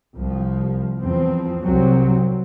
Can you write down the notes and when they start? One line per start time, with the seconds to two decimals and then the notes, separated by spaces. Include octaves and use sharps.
0.17 C2 F3
1.02 E2 F3 C4
1.62 C2 C3 F#3 C4